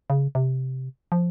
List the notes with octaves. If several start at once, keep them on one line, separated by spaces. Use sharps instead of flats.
C#3
C3
F3